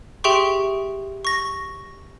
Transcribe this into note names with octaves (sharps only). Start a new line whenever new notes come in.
G4 G#4 E5 G5 C6 C#6
C#6 A#6